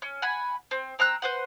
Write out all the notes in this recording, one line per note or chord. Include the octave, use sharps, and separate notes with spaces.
C#4
F#5 G#5 B5
C4
C4 A#5 E6 F#6
B4 C5 F#5